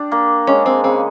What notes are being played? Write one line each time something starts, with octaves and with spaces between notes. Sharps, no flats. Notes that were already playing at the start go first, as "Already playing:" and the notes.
Already playing: D4 G4
A#3
G#3 C#4
C4
C#3 C4